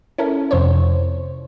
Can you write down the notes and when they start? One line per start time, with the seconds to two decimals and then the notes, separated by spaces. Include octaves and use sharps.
0.18 C#4 E4 A4 A#4
0.51 F2 C3 C5 C#5